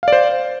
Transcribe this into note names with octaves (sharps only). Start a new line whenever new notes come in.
C5 D5 F5